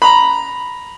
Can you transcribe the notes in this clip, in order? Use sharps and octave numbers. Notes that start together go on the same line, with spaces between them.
A#5 B5